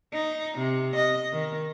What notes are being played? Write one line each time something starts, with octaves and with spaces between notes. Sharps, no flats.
D#4
C3
D#5
D#3